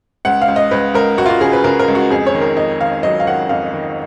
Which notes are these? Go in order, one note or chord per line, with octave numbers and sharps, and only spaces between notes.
C#2 F#5
F5
C#2
D#5
C#2 B4
C#2 A#4
C#2 F#4
F4
F#4
C#3 G#4
B4
C#3 A#4
A#4
C#2
F#4
F2 G#4
C#5
D#3
A#4
F2 D#5
D#3 F5
F#3 D#5
F5
D#3 F#5
F2 F5
D#3